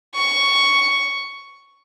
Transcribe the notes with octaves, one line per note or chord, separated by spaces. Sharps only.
C#6